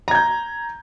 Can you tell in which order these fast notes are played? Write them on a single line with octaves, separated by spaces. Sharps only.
A#5 G#6 G6